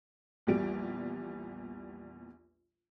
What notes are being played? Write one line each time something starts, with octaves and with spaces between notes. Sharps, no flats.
A#1 E2 G3 D7